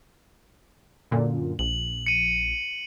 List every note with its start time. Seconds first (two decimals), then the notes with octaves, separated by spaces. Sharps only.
1.11 F#2 A#2 D3
1.59 A#1 F#7
2.06 C#7 D#7